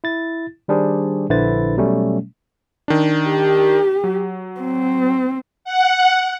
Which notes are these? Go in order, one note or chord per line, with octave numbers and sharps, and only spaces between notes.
E4 A6
D#3 G3 D4 G#4 C5
A#1 D3 E4 B4 C5 A6
B2 F#3 G3 A3 C#4
D#3 D4
G4
F#3
C4
F#5